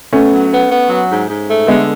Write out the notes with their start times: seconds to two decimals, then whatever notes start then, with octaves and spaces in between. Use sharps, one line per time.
0.13 A3 B3 C#4
0.33 F#3
0.51 B3
0.71 B3
0.90 F#3
1.10 G#2
1.30 G#2
1.49 A3
1.67 D3 G#3 B3